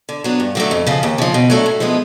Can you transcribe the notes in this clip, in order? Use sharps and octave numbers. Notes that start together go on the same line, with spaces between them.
D3
F#3 B3 D4
G2
D3 F#3 A3
F2
C#3 F3
D#2
C#3 F3
B2
F#3 A3 D4
A2
F3 G#3 B3 E4